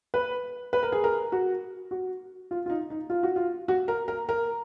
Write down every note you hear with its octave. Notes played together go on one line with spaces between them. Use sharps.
B4
B4
A#4
G#4
A#4
F#4
F#4
F4
F4
D#4
D#4
F4
F#4
F4
F#4
A#4
A#4
A#4